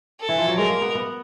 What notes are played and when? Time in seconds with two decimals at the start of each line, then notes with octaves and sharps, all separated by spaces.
0.20 A4
0.29 E3
0.38 F3
0.47 F#3
0.57 G#3 A#4
0.70 A#3
0.82 B3
0.95 B3